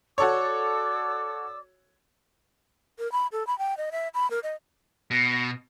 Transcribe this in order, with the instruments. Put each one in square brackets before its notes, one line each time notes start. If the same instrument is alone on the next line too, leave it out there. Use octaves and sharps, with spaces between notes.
[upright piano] F#4 A4 C#5 [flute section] D5 D6 E6
[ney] A#4
B5
A4
B5
G5
D#5
E5
B5
A#4
D#5
[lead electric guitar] B2